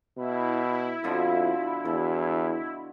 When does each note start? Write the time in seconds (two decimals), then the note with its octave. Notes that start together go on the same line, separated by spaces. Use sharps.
0.18 B2 E4
1.04 F2 B2 D3 F3
1.85 E2 B2